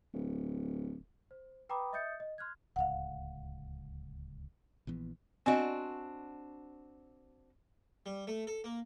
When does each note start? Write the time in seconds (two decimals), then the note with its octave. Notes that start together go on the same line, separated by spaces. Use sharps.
0.13 D1
1.31 C5
1.69 B4 G5 A#5 B5 D6 D#6
1.93 D#5 E5 D#6 G6 A6 C#7
2.20 D#5
2.38 C6 F6 F#6 G#6
2.76 D1 C#2 F5 F#5
4.87 A#1 E3 B3
5.46 C4 D4 F#4 D#5 G#5
8.06 G3
8.27 A3
8.47 A4
8.64 A#3